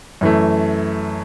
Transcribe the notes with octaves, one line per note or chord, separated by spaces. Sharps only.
F#2 E3 A3